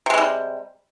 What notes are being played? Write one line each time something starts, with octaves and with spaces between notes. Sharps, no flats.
C3 E3 G3 G#3